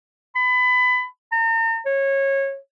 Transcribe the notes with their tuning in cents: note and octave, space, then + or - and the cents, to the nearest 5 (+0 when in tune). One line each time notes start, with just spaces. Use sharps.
B5 +25
A#5 -40
C#5 -20